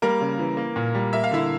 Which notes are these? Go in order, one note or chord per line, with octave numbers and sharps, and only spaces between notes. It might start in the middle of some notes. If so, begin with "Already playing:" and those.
G3 A#3 A#4
C#3
E3
A#3
A#2
G3
A#3 E5
F5
D3 E4 E5